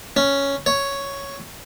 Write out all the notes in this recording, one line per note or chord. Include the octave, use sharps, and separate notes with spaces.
C#4
C#5